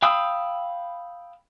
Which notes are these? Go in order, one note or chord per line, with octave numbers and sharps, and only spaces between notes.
F5 G5 B5 D#6 E6